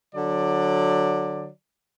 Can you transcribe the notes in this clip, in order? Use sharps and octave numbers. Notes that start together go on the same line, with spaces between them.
D3 F#3 D5